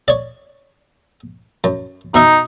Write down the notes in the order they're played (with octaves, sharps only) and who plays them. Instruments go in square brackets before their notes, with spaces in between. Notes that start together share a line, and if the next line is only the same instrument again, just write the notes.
[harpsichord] C#5 D5
F#2
[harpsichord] B2 E5 C#6 [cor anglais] D#4